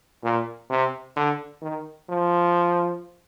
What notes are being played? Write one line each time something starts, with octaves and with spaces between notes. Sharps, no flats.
A#2
C3
D3
D#3
F3